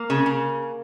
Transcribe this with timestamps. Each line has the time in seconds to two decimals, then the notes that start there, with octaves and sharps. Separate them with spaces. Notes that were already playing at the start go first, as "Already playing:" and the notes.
Already playing: A#3
0.10 C#3
0.26 C#3